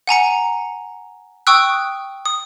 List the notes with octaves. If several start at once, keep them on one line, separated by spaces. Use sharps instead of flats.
F#5 G#5 A#5 C#7
G5 C#6 D#6 E6 F#6
D#6